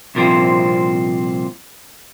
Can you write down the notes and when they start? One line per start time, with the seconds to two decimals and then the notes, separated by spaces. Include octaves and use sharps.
0.15 C2 A#2 F3 C4